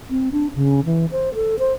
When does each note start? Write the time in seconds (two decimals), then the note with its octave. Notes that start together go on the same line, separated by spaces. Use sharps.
0.10 C4
0.32 D4
0.55 C#3
0.85 E3
1.11 C5
1.34 A4
1.59 C5